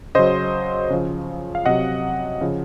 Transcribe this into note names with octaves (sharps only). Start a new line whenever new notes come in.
C#3 F#3 C5 D#5
C#3 F3
F5
C3 F#3 D#5 F#5
C#3 F3